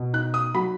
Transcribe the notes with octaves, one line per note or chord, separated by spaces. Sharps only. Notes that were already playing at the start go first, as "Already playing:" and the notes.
Already playing: B2
D#4 F#6
D#6
F#3 B5